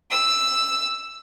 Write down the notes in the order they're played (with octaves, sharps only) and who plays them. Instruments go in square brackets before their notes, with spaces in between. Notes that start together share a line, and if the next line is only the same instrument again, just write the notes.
[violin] E6